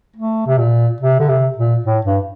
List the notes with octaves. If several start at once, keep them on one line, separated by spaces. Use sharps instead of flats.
A3
C3
A#2
C3
D3
C3
A#2
A2
G2